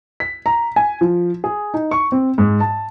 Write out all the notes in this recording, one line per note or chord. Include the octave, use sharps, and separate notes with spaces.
B6
A#5
G#5
F3
G#4
D#4
C#6
C4
G#2
A5